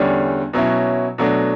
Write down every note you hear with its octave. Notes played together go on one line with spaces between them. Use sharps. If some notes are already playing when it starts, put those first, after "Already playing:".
Already playing: E2 D3 G3 C#4
B2 F#3 C#4 E4
B2 F#3 A3 D4